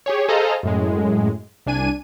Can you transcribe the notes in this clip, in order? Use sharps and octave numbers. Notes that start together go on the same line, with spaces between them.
G4 G#4 C#5
G#4 A4 C5 D#5 F5 A#5
F#2 A2 G#3
C2 D4 G#5 D#7